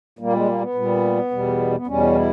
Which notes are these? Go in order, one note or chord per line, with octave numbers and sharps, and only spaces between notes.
A#2 G3 A#3
G#3
A#3
B3
A#2 G3
E2 B2 G3
B3
E2 B2 G3 C#4
E4